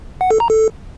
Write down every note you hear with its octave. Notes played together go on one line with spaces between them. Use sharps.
F#5
A4
A#5
A4